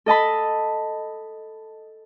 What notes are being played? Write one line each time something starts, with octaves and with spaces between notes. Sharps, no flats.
A4 D#5 A5 B5